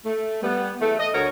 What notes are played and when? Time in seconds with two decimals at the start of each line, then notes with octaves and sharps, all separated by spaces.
0.06 A3
0.43 G3 B3
0.81 E2 A3
0.99 D#5
1.14 D2 F#4 A#4 C#5